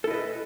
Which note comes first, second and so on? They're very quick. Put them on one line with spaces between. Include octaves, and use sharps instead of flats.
A4 E4 D#5 B4